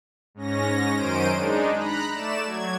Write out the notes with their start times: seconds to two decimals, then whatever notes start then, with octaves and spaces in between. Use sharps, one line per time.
0.35 G#2 C#4 A#6
0.96 F#2 D#3 C#4 C5 D7 D#7
1.32 G#3 D4 D#4
1.75 A#5 B5 F#6
2.12 A3 D5 E7
2.46 F#3 G#6